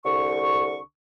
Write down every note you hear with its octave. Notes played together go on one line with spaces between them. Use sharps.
C2 D3 C#6